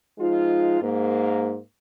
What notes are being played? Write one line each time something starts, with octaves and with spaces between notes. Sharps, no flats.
F3 G#3 D#4 F4
G#2 A#3